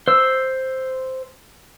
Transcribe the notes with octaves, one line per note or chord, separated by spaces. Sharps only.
C5 E6